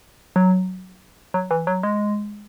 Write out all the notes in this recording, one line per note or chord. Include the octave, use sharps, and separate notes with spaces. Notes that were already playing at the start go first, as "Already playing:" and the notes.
F#3
F#3
E3
F#3
G#3